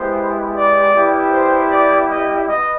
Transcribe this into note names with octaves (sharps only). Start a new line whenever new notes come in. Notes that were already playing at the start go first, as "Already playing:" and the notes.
Already playing: G#3 B3 E4 G4 C5
D5
G3 B3 E4 G4
C5
D5
D#5
B3 D#5